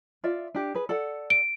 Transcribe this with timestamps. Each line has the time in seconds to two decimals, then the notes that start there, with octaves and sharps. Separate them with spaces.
0.24 F4 D5 E5
0.55 D4 G4
0.75 G#4 B4
0.89 A4 D5 F#5
1.30 D7